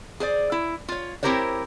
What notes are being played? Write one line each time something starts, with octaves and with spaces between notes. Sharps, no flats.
G#4 C5 D5
E4
F4 C#5
C4 E4 G4 A#4 C5 C#5